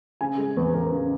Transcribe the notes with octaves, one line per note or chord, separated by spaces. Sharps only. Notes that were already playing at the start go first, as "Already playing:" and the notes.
C#3 G#5
G#3
E2
E2 A#4
C#3